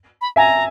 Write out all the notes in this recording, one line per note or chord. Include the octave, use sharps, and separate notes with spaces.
B5
E5 G#5 A#5